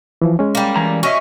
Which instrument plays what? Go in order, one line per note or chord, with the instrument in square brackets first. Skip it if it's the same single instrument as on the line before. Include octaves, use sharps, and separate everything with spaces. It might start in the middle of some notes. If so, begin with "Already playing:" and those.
[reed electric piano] E3 F3
G#3 C#4
[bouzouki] G3 A#3
[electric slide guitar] E3 G#5 A#5
[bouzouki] C#4 [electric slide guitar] F#4 D#5 E5